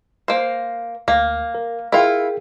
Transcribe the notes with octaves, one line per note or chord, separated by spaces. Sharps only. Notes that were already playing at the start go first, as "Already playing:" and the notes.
A#3 C5
D2 A#3
A#4
E4 F4 G#4 A#4 G5